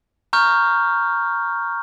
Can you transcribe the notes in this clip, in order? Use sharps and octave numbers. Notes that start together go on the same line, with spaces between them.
A#5 C#6 F6 G6